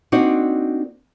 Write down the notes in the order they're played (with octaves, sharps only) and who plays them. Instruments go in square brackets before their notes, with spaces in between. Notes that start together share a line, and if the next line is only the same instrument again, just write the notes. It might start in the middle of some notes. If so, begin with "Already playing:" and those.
[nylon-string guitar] A#3 C4 D4 D#4 F#4